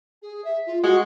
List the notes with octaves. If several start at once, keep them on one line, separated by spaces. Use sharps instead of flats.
G#4
E5
F4
G#3 F#4 F#5